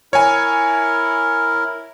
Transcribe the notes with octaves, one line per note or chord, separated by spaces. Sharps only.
E4 A#4 C#5 G#5